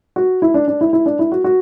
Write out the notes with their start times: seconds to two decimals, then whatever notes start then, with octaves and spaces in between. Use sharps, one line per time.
0.16 F#4
0.42 E4
0.54 D4
0.68 D4
0.81 E4
0.93 E4
1.06 D4
1.19 E4
1.32 F#4
1.44 F#4